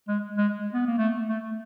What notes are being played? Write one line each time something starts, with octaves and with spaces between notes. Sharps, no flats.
G#3
G#3
B3
A#3
A3
A3